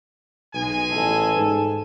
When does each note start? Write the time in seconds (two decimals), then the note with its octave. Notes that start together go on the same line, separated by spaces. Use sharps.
0.54 B1 G#3 G#5
0.91 A1 A4
1.36 G#2